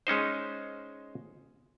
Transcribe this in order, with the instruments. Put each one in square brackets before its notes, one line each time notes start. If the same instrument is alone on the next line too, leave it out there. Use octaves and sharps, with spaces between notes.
[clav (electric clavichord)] G#3 C#4 D#4 C5